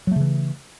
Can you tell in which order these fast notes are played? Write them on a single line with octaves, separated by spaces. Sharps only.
F#3 A3 C#3 E3